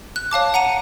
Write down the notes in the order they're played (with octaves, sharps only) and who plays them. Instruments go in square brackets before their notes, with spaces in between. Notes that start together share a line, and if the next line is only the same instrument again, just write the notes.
[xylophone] F#6
C#5 F5 A5 D6
F#5 A#5 C#7 D#7